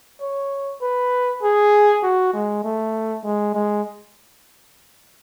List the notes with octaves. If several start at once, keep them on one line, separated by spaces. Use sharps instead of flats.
C#5
B4
G#4
F#4
G#3
A3
G#3
G#3